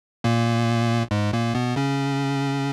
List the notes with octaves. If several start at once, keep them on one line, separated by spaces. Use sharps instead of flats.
A#2 A#3
G#2 G#3
A#2 A#3
B2 B3
C#3 C#4